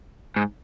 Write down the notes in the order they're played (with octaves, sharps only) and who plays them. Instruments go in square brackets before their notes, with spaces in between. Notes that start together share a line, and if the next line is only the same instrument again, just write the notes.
[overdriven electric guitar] G#2